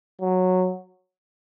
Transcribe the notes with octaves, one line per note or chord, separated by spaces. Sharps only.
F#3